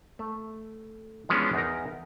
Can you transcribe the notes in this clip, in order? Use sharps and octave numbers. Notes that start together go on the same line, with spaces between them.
A3
E3 F3 G#3 B3 C#4 D4
E2 D#4 A#4